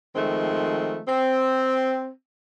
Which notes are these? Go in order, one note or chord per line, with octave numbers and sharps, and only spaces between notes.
D#3 F3 G#3 A3 C4
C4